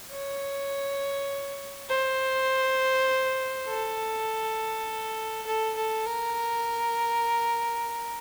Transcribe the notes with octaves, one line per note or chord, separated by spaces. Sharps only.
C#5
C5
A4
A4
A4
A#4